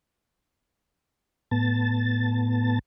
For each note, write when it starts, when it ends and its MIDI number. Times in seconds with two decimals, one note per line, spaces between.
1.51 2.79 45
1.51 2.79 59
1.51 2.79 81
1.51 2.79 93